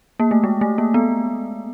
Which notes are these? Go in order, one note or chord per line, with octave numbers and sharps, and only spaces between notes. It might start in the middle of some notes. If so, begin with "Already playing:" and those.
A#3
A3
G#3
A3
A#3
B3